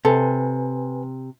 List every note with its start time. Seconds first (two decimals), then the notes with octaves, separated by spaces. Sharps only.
0.05 C3 A4 B4 G#5